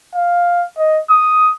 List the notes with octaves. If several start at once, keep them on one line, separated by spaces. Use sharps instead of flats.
F5
D#5
D#6